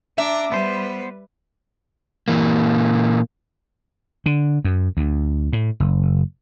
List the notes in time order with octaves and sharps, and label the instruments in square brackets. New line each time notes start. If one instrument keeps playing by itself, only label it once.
[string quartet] D4 A#5 D6 [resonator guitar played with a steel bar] E5
[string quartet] G3 B4 [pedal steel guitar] B3 C5
[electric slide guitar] A#2 E3 A#3
[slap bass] D3
F#2
D2
A2
F#1